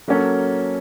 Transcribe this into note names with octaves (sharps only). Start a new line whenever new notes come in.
F#3 A#3 C#4 F#4 A4